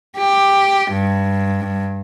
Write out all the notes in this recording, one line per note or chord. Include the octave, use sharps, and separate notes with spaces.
G4
G2